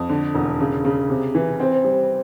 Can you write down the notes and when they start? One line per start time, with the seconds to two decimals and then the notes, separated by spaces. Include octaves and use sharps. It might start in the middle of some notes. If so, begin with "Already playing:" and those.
Already playing: F2
0.09 D3
0.35 E1
0.60 C#3
0.85 C#3
1.10 C3
1.35 E3
1.60 C4
1.84 G3